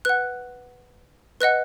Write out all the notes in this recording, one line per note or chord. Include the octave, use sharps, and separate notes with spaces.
B4 F#5 F#6
B4 D#5 F#5 F#6